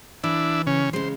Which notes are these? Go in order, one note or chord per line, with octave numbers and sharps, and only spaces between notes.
E3 D4 E4
C#3 C#4
C#3 G#3 C5